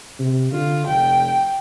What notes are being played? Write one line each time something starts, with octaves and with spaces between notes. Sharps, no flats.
C3
D3 F4
F1 G5